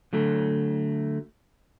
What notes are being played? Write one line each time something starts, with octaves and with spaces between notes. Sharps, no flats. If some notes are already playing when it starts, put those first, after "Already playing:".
D3 F#3 A3